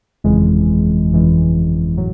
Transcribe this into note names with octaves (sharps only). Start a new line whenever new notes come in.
G1 F2 C#3 E3 G#3
G1 F2 C#3 E3 G#3
A2 F#3